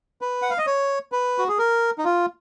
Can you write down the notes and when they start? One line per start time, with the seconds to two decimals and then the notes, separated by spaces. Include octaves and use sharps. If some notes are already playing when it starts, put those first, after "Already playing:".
0.21 B4
0.42 F#5
0.50 F5
0.58 D#5
0.67 C#5
1.12 B4
1.38 F#4
1.48 G#4
1.58 A#4
1.98 D#4
2.05 F4